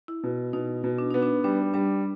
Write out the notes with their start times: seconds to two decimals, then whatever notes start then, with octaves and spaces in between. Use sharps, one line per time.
0.08 E4
0.23 B2
0.53 B2 D#4
0.84 B2
0.98 D4
1.11 B3 D#4
1.22 D4
1.44 G3 D4
1.74 G3 D4